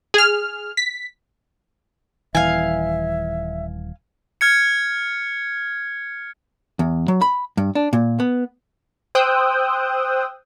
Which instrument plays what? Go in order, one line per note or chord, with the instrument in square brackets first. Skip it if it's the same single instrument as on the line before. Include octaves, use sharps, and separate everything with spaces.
[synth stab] G#4 F6
B6
[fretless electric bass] D#1 E3 [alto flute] E5 [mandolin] F5 G#5
[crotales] F6 G#6 C#7
[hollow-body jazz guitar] E2
F#3
B5
G2
D4
A#2
B3
[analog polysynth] C5 G5 D#6 E6 F#6 G6